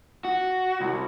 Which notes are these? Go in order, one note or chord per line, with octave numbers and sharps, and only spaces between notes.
F#4
C2